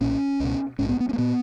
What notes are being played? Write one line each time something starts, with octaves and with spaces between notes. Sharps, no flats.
B1 A#2 C#4
C#2 B2
A#1 G#2 C#4
B3
B3
C#4
A#3
A#2 B3